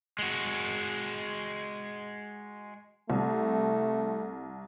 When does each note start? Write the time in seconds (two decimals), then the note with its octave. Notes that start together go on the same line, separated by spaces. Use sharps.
0.19 G#3 F#4
3.10 C2 A3